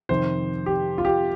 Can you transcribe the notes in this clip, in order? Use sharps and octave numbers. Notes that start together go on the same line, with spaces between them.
F2 C3 D#3 C5
G4
F4
G4